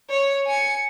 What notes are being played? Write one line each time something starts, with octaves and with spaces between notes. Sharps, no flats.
C#5
G#5 C#7